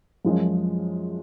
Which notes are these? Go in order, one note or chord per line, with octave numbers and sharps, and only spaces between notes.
F#2 F3 G#3 C#4